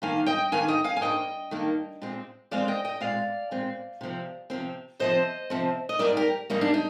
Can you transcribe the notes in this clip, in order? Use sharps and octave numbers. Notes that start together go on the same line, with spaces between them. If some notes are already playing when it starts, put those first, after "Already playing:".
G2 D#3 A#3 F5 G#5
D#5 G5
G2 D#3 A#3 F5 G#5
D#5 G5
F5 G#5
G#5
G2 D#3 A#3 D#5 G5
G2 D#3 A#3
A#2 G#3 C4
A#2 G#3 C4 D5 F5
D#5 G5
D#5 G5
A#2 G#3 C4 D5 F5
A#2 G#3 C4
C3 F3 C4
C3 F3 C4
C3 F3 C4 C5 D#5
C3 F3 C4
D#5
G#2 G3 A#3 A#4 D5
G4 A#4
G#2 G3 A#3 D#4
D4
D#4